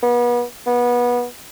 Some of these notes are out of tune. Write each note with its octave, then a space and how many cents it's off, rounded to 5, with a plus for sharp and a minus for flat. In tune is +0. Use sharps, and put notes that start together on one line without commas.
B3 -35
B3 -25